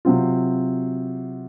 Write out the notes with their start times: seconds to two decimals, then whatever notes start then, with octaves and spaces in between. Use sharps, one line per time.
0.05 C3 F#3 C4 F4